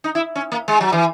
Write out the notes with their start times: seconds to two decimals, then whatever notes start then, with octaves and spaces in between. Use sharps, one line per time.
0.04 D#4
0.15 E4
0.36 C#4
0.52 A#3
0.68 G#3
0.81 F#3
0.92 E3